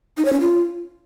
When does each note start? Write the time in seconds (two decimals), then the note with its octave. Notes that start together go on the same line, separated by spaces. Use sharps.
0.17 D#4
0.25 C#5
0.33 C#4
0.40 F4